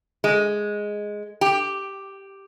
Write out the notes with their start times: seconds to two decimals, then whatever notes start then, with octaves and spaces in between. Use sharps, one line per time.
0.24 G#3
1.41 G4